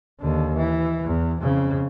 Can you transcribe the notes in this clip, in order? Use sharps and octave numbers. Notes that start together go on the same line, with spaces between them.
D#2 D3
E3
E2
F2 C#3